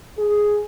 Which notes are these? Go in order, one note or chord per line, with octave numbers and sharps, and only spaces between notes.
G#4